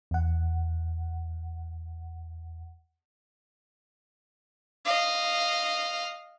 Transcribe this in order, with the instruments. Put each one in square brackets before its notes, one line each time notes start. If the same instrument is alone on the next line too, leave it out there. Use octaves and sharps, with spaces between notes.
[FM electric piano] E2 F#5
[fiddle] D#5 F5